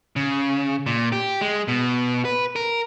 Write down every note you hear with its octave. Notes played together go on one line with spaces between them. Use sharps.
C#3
A#2
G4
G#3
B2
B4
A#4